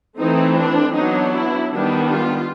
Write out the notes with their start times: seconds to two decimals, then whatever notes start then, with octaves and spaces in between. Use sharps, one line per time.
0.18 E3 A3 C4 D#4
0.57 D4
0.94 F#3 B3 D4 D#4
1.32 E4
1.72 D#3 G3 B3 D4
2.09 F4